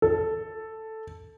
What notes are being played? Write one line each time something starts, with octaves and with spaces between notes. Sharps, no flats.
A4